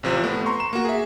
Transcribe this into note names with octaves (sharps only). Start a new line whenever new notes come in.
A1 C3 F3
A3 B3
A#5 C6 C#6
E7
A#3 F#4
G#4 E5